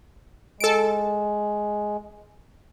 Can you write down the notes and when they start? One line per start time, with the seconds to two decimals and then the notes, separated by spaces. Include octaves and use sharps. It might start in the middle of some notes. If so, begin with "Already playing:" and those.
0.60 G#3 A4 D7